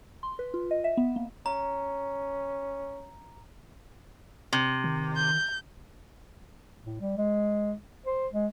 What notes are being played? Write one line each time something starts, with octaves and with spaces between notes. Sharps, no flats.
C6
B4
F4
D#5
E5
B3
A#3
C#4 A#5
C3
D#3
G6
A2
G3
G#3
C5
G#3